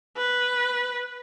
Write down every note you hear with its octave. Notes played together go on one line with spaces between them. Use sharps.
B4